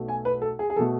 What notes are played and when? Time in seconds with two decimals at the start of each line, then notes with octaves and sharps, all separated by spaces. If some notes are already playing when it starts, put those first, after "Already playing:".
Already playing: B1 B2 F#3 A3
0.08 G#5
0.25 B4
0.42 A4
0.59 G#4
0.70 G#4
0.76 B2 A3 A4